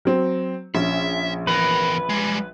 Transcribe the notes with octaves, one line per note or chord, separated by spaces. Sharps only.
F#3 C4
A#1 C#4 E5
E2 A#4 B4
G3 G#3